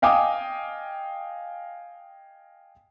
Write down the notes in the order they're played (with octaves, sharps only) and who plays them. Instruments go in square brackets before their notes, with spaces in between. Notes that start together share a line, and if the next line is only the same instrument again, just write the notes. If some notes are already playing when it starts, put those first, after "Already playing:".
[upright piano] D#5 F5 G5 G#5 D6 D#6